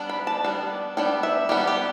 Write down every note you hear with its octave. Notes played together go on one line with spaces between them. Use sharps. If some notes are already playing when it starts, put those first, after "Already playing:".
Already playing: G3 B3 D4
B5
A5
G3 B3 D4
G3 B3 D4 G5
E5
G3 B3 D4 G4
G4